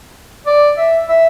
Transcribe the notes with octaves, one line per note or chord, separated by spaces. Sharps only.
D5
E5
E5